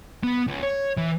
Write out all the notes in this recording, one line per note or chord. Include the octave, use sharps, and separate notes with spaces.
B3
C#2
C#5
E3